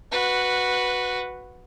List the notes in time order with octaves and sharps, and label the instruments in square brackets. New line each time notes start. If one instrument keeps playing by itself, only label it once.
[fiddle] F#4 B4